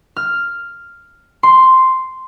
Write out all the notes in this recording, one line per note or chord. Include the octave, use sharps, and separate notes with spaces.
F6
C6